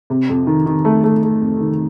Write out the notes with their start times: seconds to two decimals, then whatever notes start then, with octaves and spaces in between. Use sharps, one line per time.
0.10 C3
0.29 F2
0.47 D#3
0.66 D#3
0.85 A3
1.04 A3
1.23 A3
1.42 F2
1.60 D#3